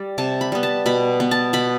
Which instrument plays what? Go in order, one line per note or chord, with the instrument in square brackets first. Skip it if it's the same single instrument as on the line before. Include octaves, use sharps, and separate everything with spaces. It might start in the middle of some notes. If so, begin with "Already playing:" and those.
Already playing: [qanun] G3 D5
C3 A5
B5
G3 B3
A5
B2 B5
B3
A5
B2 B5